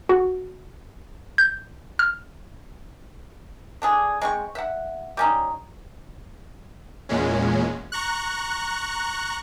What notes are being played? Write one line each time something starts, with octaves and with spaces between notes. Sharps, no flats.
F#4
G6
F6
D3 D4 G#4
G#3 C4 C#6
E5 F#5
G3 C#4 D#4
E2 A#2 G#3 C#4
A#5 C#6 F#6